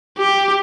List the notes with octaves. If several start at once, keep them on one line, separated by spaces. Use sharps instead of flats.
G4